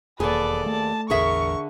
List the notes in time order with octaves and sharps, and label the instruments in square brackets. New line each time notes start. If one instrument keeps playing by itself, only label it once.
[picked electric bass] E1 [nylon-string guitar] D#2 G#4 [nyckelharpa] A4 D5 [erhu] B4
[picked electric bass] A3 [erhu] A5
[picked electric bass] A1 E2 [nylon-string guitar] D3 G#4 E5 [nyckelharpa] A#4 [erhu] C#6